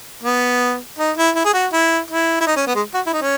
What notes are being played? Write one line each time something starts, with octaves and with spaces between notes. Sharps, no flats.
B3
D#4
E4
E4
G#4
F#4
E4
E4
E4
D#4
C#4
B3
G#3
F#4
E4
D#4
C#4